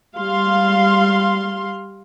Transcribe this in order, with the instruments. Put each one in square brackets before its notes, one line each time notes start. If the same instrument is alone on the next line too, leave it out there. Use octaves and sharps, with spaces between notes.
[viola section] G3 F5 C6